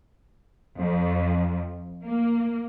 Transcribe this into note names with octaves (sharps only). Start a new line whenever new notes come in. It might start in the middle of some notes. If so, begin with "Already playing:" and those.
F2
A#3